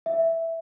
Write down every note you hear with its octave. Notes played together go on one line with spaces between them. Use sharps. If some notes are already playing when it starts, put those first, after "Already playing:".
E5